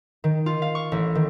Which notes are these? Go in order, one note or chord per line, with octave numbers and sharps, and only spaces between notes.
D#3
F4
F5
C#6
A1
D#3